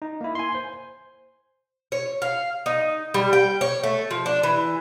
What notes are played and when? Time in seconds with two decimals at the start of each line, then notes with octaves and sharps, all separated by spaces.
0.02 D#4
0.21 A#3 E4
0.35 G#5 C6
0.55 C5
1.92 C#5
2.22 F5
2.66 D#4
3.14 G3
3.33 G5
3.61 C#5
3.83 A3
4.11 F3
4.26 D4
4.43 E3